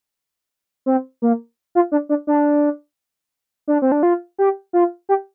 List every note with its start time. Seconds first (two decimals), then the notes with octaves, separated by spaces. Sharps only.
0.86 C4
1.22 A#3
1.75 F4
1.92 D4
2.09 D4
2.27 D4
3.68 D4
3.82 C4
3.92 D4
4.03 F4
4.39 G4
4.73 F4
5.09 G4